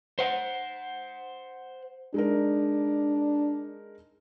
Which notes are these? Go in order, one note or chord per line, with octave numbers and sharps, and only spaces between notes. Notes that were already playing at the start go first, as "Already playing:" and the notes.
C5 F#5
G#3 D4 D#4 A#4